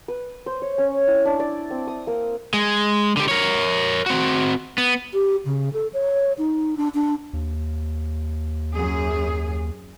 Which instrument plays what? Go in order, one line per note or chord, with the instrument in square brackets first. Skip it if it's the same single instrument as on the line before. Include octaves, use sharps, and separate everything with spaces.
[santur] B4
C5
C#5
C#4
E4
D4
D5
C4
D#6
A#3
[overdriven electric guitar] G#3
D3 G4
A#4 C#5
C4 F#4
B3
[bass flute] G4
C#3
A4
C#5
D#4
D4
D4
[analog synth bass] D#2
[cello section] F#2 G#4